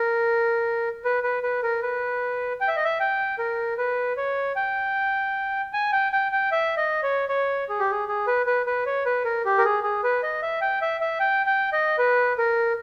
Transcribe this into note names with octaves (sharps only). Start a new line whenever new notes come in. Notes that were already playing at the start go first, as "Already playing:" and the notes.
Already playing: A#4
B4
B4
B4
A#4
B4
G5
E5
D#5
E5
G5
A#4
B4
C#5
G5
G#5
G5
G5
G5
E5
D#5
C#5
C#5
G#4
G4
G#4
G#4
B4
B4
B4
C#5
B4
A#4
G4
A#4
G#4
G#4
B4
D#5
E5
G5
E5
E5
G5
G5
D#5
B4
A#4